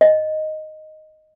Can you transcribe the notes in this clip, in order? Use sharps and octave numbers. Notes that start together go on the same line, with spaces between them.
D#5